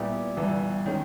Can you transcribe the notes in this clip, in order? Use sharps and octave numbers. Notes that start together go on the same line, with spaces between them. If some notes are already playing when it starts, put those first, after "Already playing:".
Already playing: A#2 G3 B3 E4 G4
G1 G2 E3
D#3 G#3 C#4